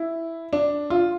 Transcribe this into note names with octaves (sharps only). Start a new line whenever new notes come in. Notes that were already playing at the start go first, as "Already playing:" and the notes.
Already playing: E4
D4
F4